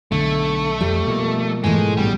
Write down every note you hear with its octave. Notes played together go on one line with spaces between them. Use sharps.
B1 D3 A3
F2 G3
B2 F3 A#3
G#2 E3 G#3 A3
A1 B2 G3